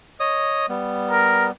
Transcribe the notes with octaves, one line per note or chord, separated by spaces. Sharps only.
C#5 D#5 D#6
G3 B3
A#4